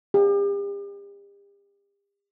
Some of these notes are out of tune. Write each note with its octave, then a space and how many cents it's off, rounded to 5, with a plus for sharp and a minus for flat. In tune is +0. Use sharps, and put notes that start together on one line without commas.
G4 +40